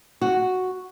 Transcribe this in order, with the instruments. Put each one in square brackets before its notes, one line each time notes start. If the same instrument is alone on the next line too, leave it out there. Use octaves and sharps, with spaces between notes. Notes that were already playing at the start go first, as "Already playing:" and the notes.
[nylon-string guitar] F#4